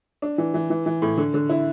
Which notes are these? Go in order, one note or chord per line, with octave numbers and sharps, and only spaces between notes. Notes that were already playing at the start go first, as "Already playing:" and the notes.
D4
E3
E3
E3
E3
A2
D3
D3
E4